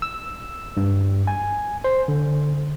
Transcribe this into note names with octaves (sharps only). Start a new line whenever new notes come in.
E6
G2
G#5
C5
D3